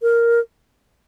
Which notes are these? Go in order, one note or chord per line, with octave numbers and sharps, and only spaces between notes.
A#4